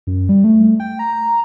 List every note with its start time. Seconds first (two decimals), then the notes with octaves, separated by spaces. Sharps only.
0.07 F#2
0.29 G3
0.44 A3
0.80 G5
0.99 A#5